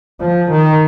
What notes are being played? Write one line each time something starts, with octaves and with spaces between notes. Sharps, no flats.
F3
D#3